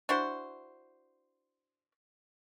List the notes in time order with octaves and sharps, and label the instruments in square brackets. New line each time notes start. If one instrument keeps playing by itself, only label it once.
[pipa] D4 E4 F#4 C5